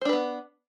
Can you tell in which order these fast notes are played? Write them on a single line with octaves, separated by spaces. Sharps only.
C5 D4 B4 B3